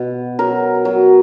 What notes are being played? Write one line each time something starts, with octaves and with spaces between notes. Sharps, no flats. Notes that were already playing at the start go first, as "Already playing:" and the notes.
Already playing: B2
F#3 A#4
F#3